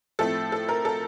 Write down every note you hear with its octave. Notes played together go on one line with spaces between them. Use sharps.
A2 F3 A3 C4 A4
A4
A#4
A4